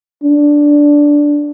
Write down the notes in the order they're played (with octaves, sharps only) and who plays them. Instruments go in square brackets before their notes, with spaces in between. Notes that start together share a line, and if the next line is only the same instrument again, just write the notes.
[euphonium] D4